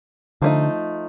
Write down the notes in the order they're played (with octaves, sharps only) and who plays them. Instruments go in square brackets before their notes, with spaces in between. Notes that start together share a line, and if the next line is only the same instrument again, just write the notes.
[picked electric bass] D3 [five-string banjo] F3 A3 D#4